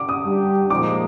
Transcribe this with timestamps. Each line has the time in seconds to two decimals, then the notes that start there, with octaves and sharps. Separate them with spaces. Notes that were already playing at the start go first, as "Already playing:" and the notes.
Already playing: D6
0.09 D#6
0.25 G3 D4 G4
0.70 A#2 F3 G#3 D#4 D6